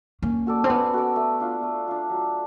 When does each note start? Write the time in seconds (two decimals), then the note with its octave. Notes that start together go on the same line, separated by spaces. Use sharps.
0.22 A#3 C#4
0.47 F#4 A4 D5
0.64 C4
0.69 B3 C#4
0.93 F#4 A4 D5
1.16 A3
1.40 D4 F4
1.63 A3
1.88 D4 F4
2.10 F#3